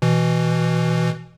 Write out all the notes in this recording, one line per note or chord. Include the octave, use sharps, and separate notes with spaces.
B2 E3